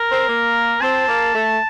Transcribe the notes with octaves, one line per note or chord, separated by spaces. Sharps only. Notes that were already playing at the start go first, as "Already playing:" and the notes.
Already playing: A#4
C4
A#3
C4 A5
A#3
A3